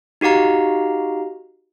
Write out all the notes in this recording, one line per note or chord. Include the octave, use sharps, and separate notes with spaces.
D#4 F#4 G4 F5 A#5